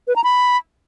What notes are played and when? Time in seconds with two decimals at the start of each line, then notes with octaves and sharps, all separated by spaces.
0.08 B4
0.16 A#5
0.24 B5